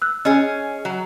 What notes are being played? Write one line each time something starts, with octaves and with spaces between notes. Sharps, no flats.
E6 F#6
C#4 G#4 D#5 G#5
F#3